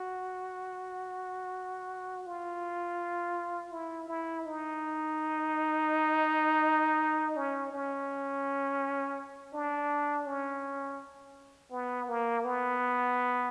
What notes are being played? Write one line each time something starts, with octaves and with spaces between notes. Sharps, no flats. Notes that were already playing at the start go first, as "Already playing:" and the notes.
Already playing: F#4
F4
E4
E4
D#4
C#4
C#4
D4
C#4
B3
A#3
B3